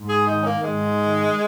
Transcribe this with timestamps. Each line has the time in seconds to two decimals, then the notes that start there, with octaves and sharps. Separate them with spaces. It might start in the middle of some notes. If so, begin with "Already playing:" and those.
Already playing: G#2
0.08 G#4
0.27 D#3 D#4
0.41 C#4
0.45 A#3
0.64 G#2 G#3
1.01 D#3